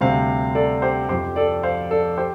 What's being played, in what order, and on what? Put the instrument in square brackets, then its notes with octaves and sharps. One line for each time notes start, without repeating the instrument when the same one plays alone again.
[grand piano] D2 C3 G3 C5 F5
A4 D5
G4 C5
F2 F3 G4 C5
A4 D5
C5 F5
A4 D5
G4 C5